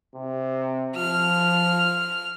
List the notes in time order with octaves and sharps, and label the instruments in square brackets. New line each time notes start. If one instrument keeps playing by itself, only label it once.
[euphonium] C3
[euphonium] F3 [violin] F6